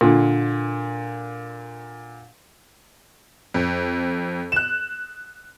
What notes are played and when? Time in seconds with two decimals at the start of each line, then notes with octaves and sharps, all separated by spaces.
0.01 A#2 D3
3.54 F2
4.52 F#6 E7